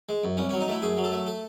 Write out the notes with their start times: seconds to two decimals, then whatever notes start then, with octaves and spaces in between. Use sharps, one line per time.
0.09 G#3
0.24 F#2
0.37 C2 C#4
0.49 F#3 C#4
0.61 D#4
0.68 A3 E4
0.82 F#2 G#4
0.97 F#3
1.04 A4
1.12 A3
1.26 A4